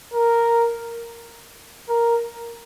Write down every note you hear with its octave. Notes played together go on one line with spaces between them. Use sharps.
A#4
A#4